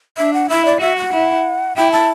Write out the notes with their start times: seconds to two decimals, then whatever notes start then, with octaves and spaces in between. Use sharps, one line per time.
0.17 D4 E5
0.33 F#5
0.49 E4 E5
0.65 D5
0.81 F#4 E5
0.96 F#5
1.12 E4
1.76 E4 G5
1.92 A5